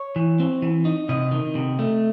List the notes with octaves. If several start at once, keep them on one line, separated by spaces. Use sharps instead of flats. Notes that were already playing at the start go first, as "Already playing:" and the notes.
Already playing: C#5
E3
C4
E3
D#4
C3 D#5
D#3
C3
A3